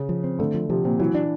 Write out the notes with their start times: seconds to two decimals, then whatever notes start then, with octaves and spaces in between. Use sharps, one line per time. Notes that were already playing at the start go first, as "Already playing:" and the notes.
Already playing: C#3
0.09 F3
0.24 C4
0.39 D3 A3
0.54 F3
0.69 C3 F3
0.85 A#2 C4
0.99 E3 F#3
1.15 D4